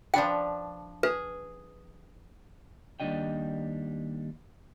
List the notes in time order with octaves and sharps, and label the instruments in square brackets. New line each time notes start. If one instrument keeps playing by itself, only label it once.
[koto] F3 D4 B4 [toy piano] G5
[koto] G#4 [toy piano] B4
[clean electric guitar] D#2 E3 G3 D4 D#5 G5